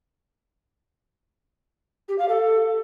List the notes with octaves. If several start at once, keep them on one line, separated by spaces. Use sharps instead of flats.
G4
F5
A4